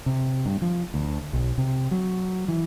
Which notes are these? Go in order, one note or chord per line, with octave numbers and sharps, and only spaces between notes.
C3
G2
F3
D2
B1
C3
F#3
E3